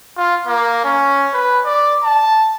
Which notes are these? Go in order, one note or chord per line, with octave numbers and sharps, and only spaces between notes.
F4
A#3
C#4
B4
D5
A5